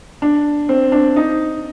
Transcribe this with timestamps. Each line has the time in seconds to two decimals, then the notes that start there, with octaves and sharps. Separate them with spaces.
0.22 D4
0.69 C4
0.92 D4
1.16 D#4